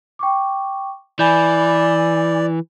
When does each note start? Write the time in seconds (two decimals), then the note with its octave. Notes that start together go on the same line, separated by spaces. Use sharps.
0.19 G5 C#6 D6
1.19 E3 D5 G#5 B5 G6